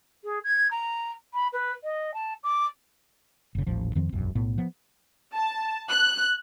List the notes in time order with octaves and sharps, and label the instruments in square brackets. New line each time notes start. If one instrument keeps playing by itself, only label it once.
[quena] G#4
G#6
A#5
B5
B4
D#5
A5
D6
[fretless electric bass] F#1 C#3
D#1 A1 F3
F2 D#3 F3 C4
E1 A#1 F#2
B1 A2 B3
F3 B3
[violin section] A5
F#6